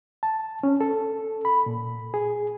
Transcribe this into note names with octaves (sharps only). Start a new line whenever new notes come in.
A5
C#4
A4
B5
A#2
G#4